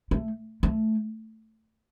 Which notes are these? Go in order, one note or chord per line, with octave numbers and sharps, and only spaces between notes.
A3
A3